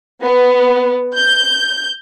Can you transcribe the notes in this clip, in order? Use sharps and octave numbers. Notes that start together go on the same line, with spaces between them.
B3
G6